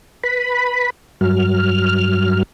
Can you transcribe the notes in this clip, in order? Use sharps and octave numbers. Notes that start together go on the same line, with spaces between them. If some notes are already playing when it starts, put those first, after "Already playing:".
B4 B5
G2 F#3 F6